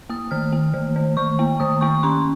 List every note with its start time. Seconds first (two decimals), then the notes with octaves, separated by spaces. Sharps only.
0.09 A#3 D#6
0.31 D#3 F6
0.52 A#3
0.74 D#3
0.96 D#3
1.17 D#3 C#6
1.39 A#3
1.60 D#3 D#6
1.81 A#3 C#6
2.03 C#4 C6